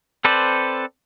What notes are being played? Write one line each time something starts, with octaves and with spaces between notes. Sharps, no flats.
C4 A4 B4 C5 D5